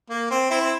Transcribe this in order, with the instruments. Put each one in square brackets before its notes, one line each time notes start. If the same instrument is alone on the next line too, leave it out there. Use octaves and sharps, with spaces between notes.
[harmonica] A#3
C4
C4 E4
C4